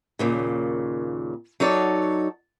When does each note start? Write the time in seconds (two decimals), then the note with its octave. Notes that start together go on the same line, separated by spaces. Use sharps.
0.19 D#2 A#2 C#3
1.60 F#3 D#4 A4 C#5 D5